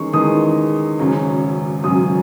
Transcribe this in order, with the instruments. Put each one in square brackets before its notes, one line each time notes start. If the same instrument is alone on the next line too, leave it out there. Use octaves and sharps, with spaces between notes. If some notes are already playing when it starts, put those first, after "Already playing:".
Already playing: [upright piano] E2 D#3 G#3 C#4 C#6
E2 D#3 G#3 C#4 D#6
G#1 F#2 C#3 F#3 C#4
G#1 F#2 C#3 F#3 C#4 D#6